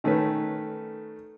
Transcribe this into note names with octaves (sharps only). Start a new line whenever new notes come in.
D#3 A3 C#4 D#4 B4